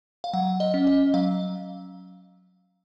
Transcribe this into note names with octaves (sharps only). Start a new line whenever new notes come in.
F5
F#3 F#5
D#5
C#4
D#5
F#3 F5